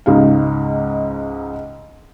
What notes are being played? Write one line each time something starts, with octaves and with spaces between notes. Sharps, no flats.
C#2 G#2 D#4 F5